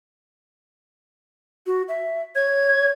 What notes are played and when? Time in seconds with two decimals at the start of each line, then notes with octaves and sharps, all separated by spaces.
1.67 F#4
1.88 E5
2.35 C#5 G#6